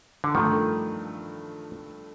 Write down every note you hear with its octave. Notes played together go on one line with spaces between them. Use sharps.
D3
G2 D#3 F3 A3